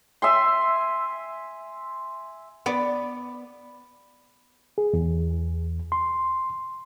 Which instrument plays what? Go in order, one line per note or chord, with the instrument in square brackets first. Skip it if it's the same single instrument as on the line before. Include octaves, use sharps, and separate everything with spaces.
[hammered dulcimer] E5 G#5 C6
[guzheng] B3 D5
[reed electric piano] G#4
E2
C6